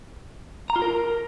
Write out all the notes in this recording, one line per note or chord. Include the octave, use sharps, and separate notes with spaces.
A#5
F4
A#4